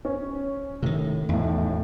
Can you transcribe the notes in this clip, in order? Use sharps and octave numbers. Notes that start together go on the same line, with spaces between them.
C#4
A2 C3 D#3
B1 E2 A2